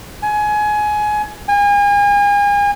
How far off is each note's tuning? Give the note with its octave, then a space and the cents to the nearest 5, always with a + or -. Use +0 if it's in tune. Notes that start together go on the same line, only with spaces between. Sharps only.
G#5 +20
G#5 -35